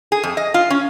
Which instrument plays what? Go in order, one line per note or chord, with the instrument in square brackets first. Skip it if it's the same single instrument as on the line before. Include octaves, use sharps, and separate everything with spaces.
[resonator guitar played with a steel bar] G#4
F2
D#5
F4
C#4